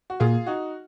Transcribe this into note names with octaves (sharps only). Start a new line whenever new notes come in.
F#4
A#2 F4 G#4
D#4 F#4